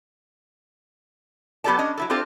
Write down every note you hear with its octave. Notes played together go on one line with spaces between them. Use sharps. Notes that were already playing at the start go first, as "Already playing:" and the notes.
F#3 B3 G4 A4 D5 A5
C#4 D4 D#5
F#3 E4 A4
C4 D4 F4 G4 A4 C5